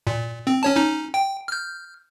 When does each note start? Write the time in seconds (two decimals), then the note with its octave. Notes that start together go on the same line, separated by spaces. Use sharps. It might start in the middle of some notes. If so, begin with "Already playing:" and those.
0.07 A#2
0.47 C4
0.63 C#4 C#5 A5
0.76 C#4 D#4
1.14 G5
1.48 F6 G6